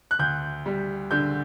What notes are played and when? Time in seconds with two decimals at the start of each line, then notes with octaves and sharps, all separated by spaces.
0.11 F#6
0.19 D2 G6
0.66 G3
1.11 D3 G6